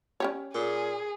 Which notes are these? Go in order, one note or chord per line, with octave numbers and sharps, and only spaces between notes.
C#4 G4 C#5
A#2 G#4